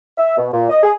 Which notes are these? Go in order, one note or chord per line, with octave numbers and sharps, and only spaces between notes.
E5
B2
A#2
D#5
G#4